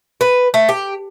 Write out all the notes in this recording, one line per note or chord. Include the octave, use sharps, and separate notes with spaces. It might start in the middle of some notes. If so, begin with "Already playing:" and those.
B4
A3
G4